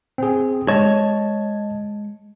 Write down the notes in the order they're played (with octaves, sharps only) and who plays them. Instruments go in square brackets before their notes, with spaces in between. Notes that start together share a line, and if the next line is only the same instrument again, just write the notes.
[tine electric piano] C4 G#4
[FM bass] G#3 [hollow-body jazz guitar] C#5 [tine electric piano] D#5 A5